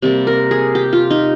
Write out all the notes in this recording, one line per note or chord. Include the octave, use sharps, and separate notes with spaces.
C3 G3 A#3
A#4
G#4
G4
F4
D#4